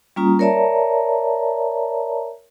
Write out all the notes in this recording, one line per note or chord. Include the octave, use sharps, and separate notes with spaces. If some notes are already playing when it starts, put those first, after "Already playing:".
G3 A#3 C#4 F4 A#5 D#6
A#4 C#5 D5 E5 A5 A#5